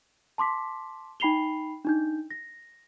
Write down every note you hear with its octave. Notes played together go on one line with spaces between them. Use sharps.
A5 C6 D6 B6
D#4 G5 B5 C7 F7 G7
D4 D#4 G6
A#6